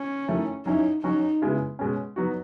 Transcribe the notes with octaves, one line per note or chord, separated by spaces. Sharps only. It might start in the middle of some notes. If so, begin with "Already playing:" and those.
Already playing: C#4
D#3 A3 E4
F#3 C#4 D#4 E4
F#3 C#4 D#4 F#4
C#3 G#3 B3 E4
B2 G#3 C#4
F#3 B3 D#4 F#4